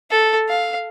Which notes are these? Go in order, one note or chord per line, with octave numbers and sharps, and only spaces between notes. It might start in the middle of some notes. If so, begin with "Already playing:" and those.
A4
F5